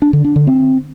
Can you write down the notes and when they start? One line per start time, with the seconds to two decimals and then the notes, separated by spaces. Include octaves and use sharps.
0.02 D4
0.13 D3
0.24 D4
0.36 D3
0.47 C4